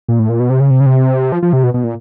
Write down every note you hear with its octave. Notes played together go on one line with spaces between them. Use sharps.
A#2
A2
A#2
B2
C3
C#3
C3
C#3
C3
F3
F3
C3
B2
B2
A#2